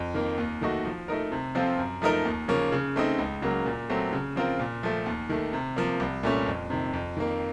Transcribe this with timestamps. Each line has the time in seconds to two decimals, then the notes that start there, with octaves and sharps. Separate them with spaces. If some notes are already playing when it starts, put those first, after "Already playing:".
Already playing: F2
0.14 D#3 A#3
0.38 D#2
0.61 D#3 A3 D#4 F#4
0.85 F3
1.08 A3 D#4 A#4
1.32 C3
1.55 F3 C4 F4 A4
1.78 F#2
2.02 F3 A3 D#4 A#4
2.25 D#2
2.48 C#3 F3 A#3 C#4
2.72 C#3
2.96 A3 C4 D#4
3.18 C#2
3.42 C#3 F#3 A#3
3.66 A#2
3.89 F#3 A3 C4
4.13 C#3
4.36 F3 C4 F4 A#4
4.59 A#2
4.83 F3 A3
5.06 D#2
5.29 D#3 A3
5.53 C3
5.76 F3 A#3
6.00 C2
6.23 A#2 A3 C#4
6.46 F2
6.70 C3 D#3
6.93 F2
7.17 D#3 A#3